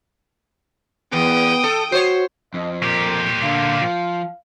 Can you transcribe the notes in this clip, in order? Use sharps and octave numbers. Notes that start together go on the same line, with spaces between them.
E2 B3 G5 D#6
A4
F#4 C5 C#5
F2 D#5
A#2 G4 A#4
D3 F5
F3